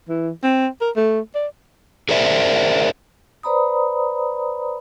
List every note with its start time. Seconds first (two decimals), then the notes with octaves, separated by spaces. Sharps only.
0.09 E3
0.44 C4
0.81 A#4
0.96 A3
1.35 D5
2.09 G#4 A#4 C5 D5 E5
3.43 B4 C5 D5 A#5 B5 D#6